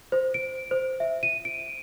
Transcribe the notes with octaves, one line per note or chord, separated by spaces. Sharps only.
C5
D7
C5
E5
D#7
D7